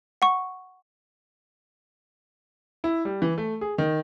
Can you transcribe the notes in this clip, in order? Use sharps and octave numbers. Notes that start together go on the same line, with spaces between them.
F#5 C#6
E4
G3
E3
A3
G#4
D#3